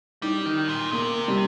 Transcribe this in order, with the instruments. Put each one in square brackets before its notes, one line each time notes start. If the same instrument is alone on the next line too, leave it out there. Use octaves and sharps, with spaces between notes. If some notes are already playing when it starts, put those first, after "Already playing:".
[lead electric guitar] G3 [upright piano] D#4
[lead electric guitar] D#3
A#2
[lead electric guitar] C3 [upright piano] A#3
[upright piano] G3